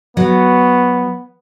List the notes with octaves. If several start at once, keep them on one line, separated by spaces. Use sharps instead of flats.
F#3 B3